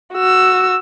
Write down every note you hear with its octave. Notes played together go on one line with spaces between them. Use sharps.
F#4 E6